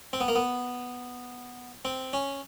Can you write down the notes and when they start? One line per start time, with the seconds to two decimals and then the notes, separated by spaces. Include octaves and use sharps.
0.13 C4
0.20 B3
0.28 A#3
0.35 B3
1.85 C4
2.13 C#4